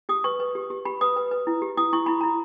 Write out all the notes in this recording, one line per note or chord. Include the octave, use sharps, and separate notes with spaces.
G4 D#6
B4 C#6
B4
G4
G4
G4 B5
B4 D#6
B4
B4
E4
G4
E4 D#6
E4 C#6
E4 B5
E4 A#5